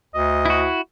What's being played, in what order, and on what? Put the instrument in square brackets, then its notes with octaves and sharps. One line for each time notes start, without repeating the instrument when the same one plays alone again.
[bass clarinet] D2 [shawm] D#5
[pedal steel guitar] E4 F#4